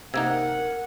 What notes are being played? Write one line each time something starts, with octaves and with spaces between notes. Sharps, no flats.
C3 A#3 D#4 A#4 F#5 E6 G#6